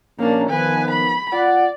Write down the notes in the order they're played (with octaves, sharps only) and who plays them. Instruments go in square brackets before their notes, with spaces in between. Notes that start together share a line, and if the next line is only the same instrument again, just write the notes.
[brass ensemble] A#1 C#4 A#5 [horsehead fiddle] A#3 D4
[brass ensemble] D#3 F3 B3 [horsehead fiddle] B4 G#5
[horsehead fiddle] B5
[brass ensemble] F4 F#5 [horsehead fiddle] D5